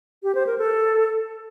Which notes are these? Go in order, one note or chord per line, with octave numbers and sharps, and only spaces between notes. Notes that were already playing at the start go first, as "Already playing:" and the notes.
G4
C5
A#4
A4